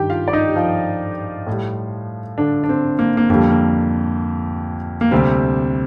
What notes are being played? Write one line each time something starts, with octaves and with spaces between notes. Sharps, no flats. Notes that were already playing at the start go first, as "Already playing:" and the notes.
Already playing: G2 D#3 G3 G4 G5
F4 F5
D5
D#4 D#5
G4
F3 F4
A2
G3
D3 D4
D4
C4
A#3
A#3
F2 D3 G3 A#3
A#3
A#3
D2 C3 G3 C4